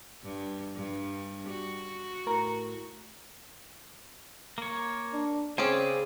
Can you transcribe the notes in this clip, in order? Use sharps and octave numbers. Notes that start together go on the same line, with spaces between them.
G2
G2
F#4
A2 A#4 A#5
A#3 C#5
D4
C#3 C4 C#4 G#4 D5 D6